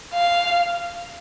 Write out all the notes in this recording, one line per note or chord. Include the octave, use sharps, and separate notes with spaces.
F5